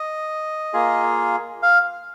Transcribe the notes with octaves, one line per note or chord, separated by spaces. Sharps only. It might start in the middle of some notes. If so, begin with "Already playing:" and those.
Already playing: D#5
A#3 F4 G#4
F5